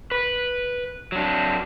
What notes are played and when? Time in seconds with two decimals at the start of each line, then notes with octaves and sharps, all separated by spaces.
0.11 B4
1.12 F#3 D4